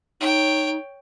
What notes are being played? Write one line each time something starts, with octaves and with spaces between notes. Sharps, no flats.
D#4 C#5 G5